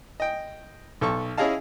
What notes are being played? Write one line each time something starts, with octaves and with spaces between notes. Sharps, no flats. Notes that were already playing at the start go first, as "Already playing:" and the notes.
D#5 G5
B1 A4 C#6
C#4 E4 G#4 D#5 F5 A5